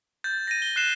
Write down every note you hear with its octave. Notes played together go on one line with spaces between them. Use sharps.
G6 A6
A#6 D#7
G7
F#6 C7 E7